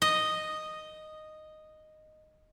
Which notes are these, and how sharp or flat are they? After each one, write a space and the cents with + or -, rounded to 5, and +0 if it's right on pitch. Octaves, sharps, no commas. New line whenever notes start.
D#5 -5